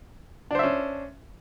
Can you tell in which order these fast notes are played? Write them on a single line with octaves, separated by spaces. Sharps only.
D4 C5 E5 C#4